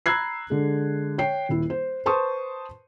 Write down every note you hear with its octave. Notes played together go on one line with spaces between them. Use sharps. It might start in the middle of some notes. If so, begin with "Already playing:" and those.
A#5 B5 E6 F#6 G#6 C7
D3 G#3
C#5 G5 C7
D#1 E4
C5
B4 C5 A5 C6 C#6 D#6